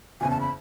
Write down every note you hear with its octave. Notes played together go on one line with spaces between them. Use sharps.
F#1 E2 C#3 G#5
A5
B5